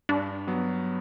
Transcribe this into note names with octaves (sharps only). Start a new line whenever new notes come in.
G2 D4
F#3 B3